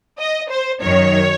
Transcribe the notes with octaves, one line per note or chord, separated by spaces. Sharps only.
D#5
C5
F#2 D#3 F#3 C#5